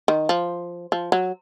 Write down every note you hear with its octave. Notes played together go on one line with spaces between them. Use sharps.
D#3
F3
F3
F#3